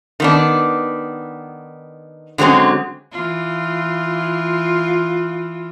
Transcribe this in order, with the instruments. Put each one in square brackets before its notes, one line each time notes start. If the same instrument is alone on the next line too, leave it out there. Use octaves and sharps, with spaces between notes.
[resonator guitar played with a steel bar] D#3 B3 D4
D3 F#3 G#3 C4 C#4
[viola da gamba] E3 F4